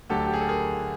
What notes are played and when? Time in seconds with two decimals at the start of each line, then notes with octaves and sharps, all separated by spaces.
0.10 D2 D3 F#3 G4 A4
0.27 G4
0.34 G#4
0.41 A4
0.48 G#4 A#4